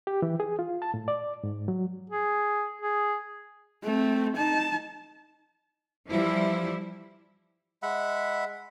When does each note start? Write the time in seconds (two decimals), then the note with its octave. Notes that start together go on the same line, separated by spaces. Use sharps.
0.07 G4
0.22 E3
0.40 G#4
0.59 F4
0.82 A5
0.94 A2
1.08 D5
1.44 G#2
1.68 F#3
2.10 G#4
2.81 G#4
3.84 A3 C4
4.36 D#4 A5
6.08 E3 F3 G3 E4
7.83 G#3 E5 F#5 B5